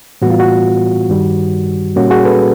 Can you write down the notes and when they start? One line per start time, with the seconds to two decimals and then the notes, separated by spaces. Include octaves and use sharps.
0.22 A2 E3 G3 B3 F#4
0.30 F4
0.40 F#4
1.10 G2 D#3 G3
1.96 A#2 G3 A#3 C#4 F#4
2.10 F#4 G#4
2.25 A4 B4